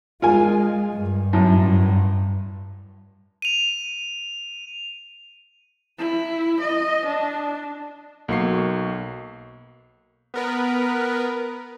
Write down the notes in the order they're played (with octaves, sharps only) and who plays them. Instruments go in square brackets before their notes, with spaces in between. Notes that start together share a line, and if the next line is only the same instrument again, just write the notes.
[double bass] G#3 [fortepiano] F4 A#4 G#5
[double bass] G2
[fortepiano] F#2 A2
[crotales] D#7 F7
[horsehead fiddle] E4
D#5
D4
[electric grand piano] B1 A#3 F#4 C#6 C7
[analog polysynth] B3 A#4 B4